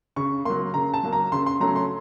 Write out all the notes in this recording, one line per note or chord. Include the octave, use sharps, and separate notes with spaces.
C#3 C#6
F#3 A#3 C6
C#3 A#5
A5
F#3 A#3
A#5
C#3 C6
C6
F#3 A3 C#4 A#5
C6